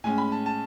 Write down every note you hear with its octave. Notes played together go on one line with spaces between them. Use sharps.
A2 G#3 C#4 G#5
B5
A5
A5